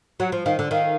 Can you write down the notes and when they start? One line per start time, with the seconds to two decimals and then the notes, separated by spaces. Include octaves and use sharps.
0.20 F#3 F#5
0.32 F3
0.45 D#3 F5
0.59 D3
0.71 D#3 F5